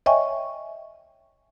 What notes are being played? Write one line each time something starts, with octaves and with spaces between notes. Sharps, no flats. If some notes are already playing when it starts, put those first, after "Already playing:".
C#5 D#5 E5 G5 G#5 C#6